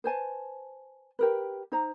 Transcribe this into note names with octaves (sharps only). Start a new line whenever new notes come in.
B4 C5 G#5 A5
G4 A#4 B4
D#4 C5 A#5